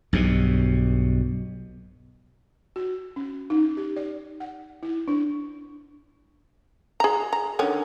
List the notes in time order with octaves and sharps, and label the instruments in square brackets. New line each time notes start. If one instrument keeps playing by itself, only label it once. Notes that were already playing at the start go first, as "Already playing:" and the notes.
[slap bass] B1 G2 B2
[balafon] F#4
C#4
D#4
G4
D5
F#5
E4
D4
[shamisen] G#4 A#5
A#5
D3 D#3 C#4